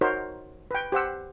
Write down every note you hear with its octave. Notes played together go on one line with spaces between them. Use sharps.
D#4 F#4 A#4 C5 C#5
B4 G5
G4 C5 F#5 E6